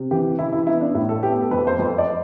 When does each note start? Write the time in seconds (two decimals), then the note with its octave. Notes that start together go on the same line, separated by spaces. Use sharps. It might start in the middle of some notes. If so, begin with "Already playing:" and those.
Already playing: C3
0.11 E3 G4
0.39 E3 E4
0.53 E4
0.67 B3 E4
0.81 D4
0.94 A2 E4
1.09 A4
1.23 B3 G4
1.42 A4
1.51 F2 B4
1.67 C5
1.79 F2 B4
1.98 D5